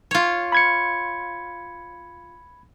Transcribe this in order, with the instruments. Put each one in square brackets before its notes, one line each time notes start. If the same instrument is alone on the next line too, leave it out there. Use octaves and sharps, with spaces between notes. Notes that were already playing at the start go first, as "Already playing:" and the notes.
[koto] F4 C#5
[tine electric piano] B5 G#6 C#7